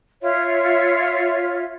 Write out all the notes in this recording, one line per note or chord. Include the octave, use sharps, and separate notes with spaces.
F4 C#5 E5